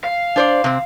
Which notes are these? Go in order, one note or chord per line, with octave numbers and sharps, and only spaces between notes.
F5
D4 C5 D5
C3 C4